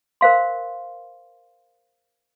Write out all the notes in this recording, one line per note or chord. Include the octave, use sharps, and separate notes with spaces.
A#4 C5 F5 C6